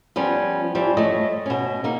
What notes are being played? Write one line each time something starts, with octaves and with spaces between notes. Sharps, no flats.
F3 G3 B3 C#4
E3 F3 G3
A3 C#5 D#5
B2 C#4
A#3 D#4